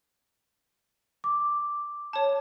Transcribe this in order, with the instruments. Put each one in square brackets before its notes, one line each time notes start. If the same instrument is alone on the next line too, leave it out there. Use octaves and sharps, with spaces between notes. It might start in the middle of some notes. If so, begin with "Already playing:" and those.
[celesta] D6
[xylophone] C#5 A5